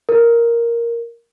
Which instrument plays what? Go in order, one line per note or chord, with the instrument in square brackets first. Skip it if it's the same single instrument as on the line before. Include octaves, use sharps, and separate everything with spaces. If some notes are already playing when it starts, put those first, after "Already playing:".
[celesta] A#4